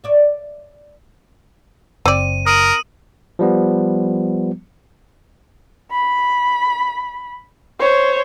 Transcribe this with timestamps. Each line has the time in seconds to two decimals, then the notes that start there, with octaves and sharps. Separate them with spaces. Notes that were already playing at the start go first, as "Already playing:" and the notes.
0.04 C#5 D5 E5
2.06 F#1 C4 D5 D#7
2.47 A#4 D#6 D#7
3.39 F3 G3 B3
5.91 B5
7.79 C5 C#5